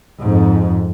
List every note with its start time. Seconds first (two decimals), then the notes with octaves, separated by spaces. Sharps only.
0.21 F2 G#2